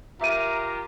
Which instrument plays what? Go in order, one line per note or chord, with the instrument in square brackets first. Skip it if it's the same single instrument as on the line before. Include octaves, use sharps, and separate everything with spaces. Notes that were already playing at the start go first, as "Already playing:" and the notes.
[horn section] F4 G4 A#4 [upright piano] E5 D#7 [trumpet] A#5